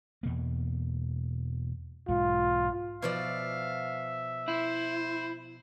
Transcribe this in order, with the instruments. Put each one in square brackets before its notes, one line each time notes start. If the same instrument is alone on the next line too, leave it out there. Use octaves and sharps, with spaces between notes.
[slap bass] E2 B2 A#3
[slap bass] B1 G#2 [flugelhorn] F4
[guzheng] B2 F3 D5 [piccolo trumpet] E5 [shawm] F5
[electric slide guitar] E4 [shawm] C5